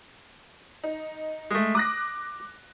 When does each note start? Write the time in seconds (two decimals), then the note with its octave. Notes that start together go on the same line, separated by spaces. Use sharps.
0.84 D#4
1.51 G#3 A3
1.75 D6 D#6 F#6 A#6